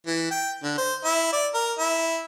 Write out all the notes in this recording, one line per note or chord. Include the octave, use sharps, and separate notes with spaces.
E3
G5
D3
C5
E4
D5
A#4
E4